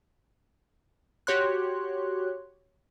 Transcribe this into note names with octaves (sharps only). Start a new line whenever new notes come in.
F#4 G4 C#5 C6 F#6